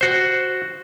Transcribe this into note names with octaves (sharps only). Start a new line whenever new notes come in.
F#4 C5